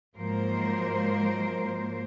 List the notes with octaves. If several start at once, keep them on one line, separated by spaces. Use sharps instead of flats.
G#2 F3 F#3 A#3 A#4 C5